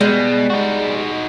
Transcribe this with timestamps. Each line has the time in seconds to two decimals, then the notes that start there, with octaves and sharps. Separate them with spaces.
0.01 B2 G3 G#3
0.50 D#4 F#4